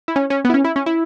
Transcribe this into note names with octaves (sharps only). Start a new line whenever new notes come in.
E4
C#4
C#4
B3
E4
C#4
E4
C#4
E4